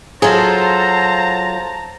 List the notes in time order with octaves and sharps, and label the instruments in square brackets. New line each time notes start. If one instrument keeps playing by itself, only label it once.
[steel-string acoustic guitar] F#3 F4 A4 [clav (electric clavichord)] G#4 [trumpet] C5 [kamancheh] A5 A#5